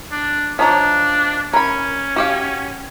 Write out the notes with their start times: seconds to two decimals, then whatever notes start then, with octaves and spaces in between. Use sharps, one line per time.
0.12 D4
0.59 F3 D4 D#4 C#5
1.53 C#4 A#4 B5
2.16 F#4 G4 F5